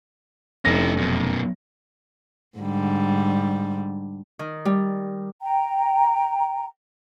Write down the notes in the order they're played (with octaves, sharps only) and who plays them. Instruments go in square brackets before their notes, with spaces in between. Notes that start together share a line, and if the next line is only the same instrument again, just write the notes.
[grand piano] F1 A#6 [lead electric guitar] C#4 E4
[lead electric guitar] F#2 B2
[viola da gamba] G#2 D3 G3
[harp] D#3
G3
[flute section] G5 A#5